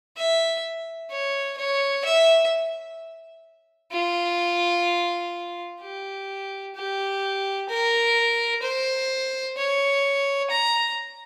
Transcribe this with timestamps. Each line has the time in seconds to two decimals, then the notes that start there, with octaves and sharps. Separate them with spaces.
0.17 E5
1.10 C#5
1.57 C#5
2.05 E5
3.92 F4
5.81 G4
6.75 G4
7.69 A#4
8.62 C5
9.57 C#5
10.50 A#5